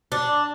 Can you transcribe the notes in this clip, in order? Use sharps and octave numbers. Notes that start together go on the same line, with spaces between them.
D4